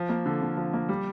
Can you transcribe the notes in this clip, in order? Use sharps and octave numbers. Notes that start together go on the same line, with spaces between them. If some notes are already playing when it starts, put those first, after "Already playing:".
Already playing: F3
A#3
D3
D3
F3
A#3
G3